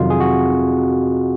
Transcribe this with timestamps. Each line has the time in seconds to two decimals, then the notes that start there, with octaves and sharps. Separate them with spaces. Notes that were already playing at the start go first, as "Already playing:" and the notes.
Already playing: F2 C3 D#3 F#3 F4
0.10 G#4
0.20 F#4